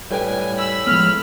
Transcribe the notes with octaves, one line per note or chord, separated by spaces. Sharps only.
A2 G3 B4 G5 G#5
B5 E6
F3 G#3 B3 F6